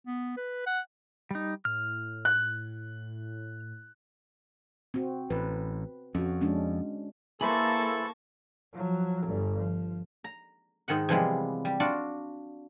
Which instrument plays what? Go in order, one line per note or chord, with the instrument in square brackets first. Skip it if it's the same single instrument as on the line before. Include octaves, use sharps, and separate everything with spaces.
[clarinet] B3
B4
F#5
[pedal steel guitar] G3 D#4
[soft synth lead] A2 [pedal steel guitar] F6
[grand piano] F#6
[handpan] C4 F#4
[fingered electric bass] A1 [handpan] B4
[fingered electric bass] F2 [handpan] C#4 F#4
[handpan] G#3 C#4 D4
[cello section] A#3 [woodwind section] E4 A4 [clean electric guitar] G#4 B4 C5 [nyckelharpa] A5 C#6
[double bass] F3 F#3
G1 G2
F3
[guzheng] A#5
G#2 D#3 D#5 F#5
C3 E3 F3 G3 G#3 B3
G3
D4 F4 F#4 D5